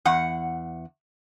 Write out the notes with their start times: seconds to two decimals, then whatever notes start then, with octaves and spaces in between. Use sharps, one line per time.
0.05 E2 F#5